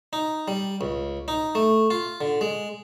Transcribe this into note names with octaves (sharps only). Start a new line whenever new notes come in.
D#4
G3
C#2
D#4
A3
F4
D3
G#3